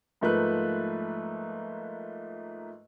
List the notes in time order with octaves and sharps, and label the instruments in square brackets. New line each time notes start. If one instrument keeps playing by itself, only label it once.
[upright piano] G#2 F3 A3 A#3 B4 F#6